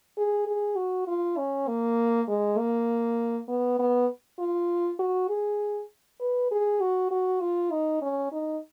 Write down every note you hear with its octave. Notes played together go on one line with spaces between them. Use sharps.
G#4
G#4
F#4
F4
C#4
A#3
G#3
A#3
B3
B3
F4
F#4
G#4
B4
G#4
F#4
F#4
F4
D#4
C#4
D#4